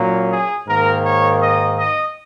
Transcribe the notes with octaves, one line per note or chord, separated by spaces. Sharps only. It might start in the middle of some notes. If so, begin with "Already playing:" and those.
Already playing: A#2 F#3 A#3 C#4
G#4
G#2 D#3 A#3 A#4
C#5
D#5
D#5